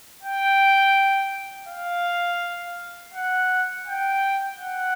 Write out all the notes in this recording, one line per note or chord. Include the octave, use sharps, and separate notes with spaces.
G5
F5
F#5
G5
F#5